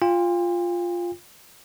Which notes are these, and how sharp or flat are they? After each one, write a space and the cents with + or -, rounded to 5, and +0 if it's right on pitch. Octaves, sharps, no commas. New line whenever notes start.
F4 +0 G5 +40